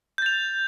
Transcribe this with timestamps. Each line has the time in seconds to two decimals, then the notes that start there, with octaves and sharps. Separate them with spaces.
0.18 G6
0.22 A6
0.26 F7